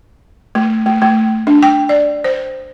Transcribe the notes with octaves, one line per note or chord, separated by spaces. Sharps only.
A3
A3
A3
D4
G5
D5
C5